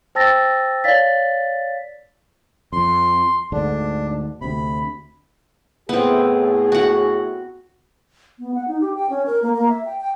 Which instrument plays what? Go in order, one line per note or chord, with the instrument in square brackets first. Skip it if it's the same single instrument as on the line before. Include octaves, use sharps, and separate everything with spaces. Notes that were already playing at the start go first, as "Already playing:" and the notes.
[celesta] C5 G5 A5 E6 A6 A#6
C#5 D5 F5 A6 B6
[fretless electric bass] F2 [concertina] C6
[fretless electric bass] D2 G#2 D3 [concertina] D4
[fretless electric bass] D2 C3 [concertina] B5
[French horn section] A2 G#4 [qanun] B3 C4
[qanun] F#4 F#5
[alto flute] B3
F#5
D#4
G4
G5
C#4
A#4
A#3
A#3
E5
G5
G5